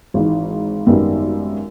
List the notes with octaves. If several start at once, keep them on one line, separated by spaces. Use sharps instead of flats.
G#1 G#2 E3
G#1 F#2 D#3 G3 B3